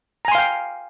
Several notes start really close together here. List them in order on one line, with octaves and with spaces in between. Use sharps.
A#5 G#5 C6 F5 G5